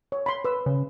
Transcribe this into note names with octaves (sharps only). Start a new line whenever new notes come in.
C#5
B5 C6
B4 E6
C#3